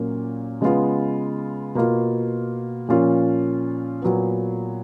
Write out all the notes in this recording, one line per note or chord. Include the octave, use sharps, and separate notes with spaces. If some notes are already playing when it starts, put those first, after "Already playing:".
Already playing: A#2 F#3 A#3 C#4 F4
C#3 G#3 B3 F4
B2 A#3 F4
A#2 F3 A#3 C#4 F4
A#2 F#3 B3